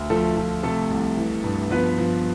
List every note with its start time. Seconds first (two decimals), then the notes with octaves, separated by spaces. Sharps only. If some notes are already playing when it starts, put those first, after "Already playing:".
Already playing: D2
0.10 F3 A3 A4
0.37 F3
0.63 C3 A3 A4
0.91 C2
1.17 E3
1.44 G2
1.71 F3 B3 B4
1.98 F3